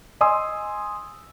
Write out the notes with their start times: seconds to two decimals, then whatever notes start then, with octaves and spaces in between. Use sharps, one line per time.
0.21 D#5 G#5 C6 D#6 E6